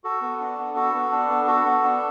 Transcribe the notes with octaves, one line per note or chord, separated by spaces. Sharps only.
F#4 A4
B3
D4
B3
F#4 A4
B3
D4
B3
F#4 A4
B3
D4